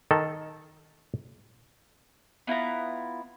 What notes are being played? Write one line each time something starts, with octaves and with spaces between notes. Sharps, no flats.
D#3 A4
B3 E4 F4 A#5